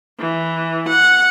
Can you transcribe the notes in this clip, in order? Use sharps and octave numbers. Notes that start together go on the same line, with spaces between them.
E3
F#5